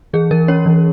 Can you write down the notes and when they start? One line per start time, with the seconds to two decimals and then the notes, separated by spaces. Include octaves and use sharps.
0.13 E3 G#4
0.31 E3 A#4
0.48 C#4 C#5
0.66 E3